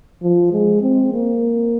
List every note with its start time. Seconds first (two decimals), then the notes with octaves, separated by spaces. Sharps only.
0.23 F3
0.53 G#3
0.82 C4
1.13 A#3